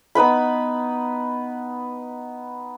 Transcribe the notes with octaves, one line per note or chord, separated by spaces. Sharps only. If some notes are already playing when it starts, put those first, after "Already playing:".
B3 D#4 B4 B5